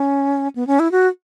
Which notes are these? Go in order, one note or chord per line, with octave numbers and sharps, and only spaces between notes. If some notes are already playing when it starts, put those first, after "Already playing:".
Already playing: C#4
B3
C#4
E4
F#4